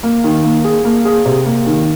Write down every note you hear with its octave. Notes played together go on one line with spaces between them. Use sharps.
A#3
D#3
A#3
G#4
A#3
G#4
C3
A#3
D#3